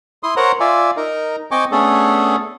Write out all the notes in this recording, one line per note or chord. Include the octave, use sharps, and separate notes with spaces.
E4 C6 D#6
A#4 C5 C#5 F#5 A#5
F4 D5 E5 G#5
D#4 A#4
C4 D#5 G5 G#5 C#6 D6
A3 B3 C#4 D4 G#4 A4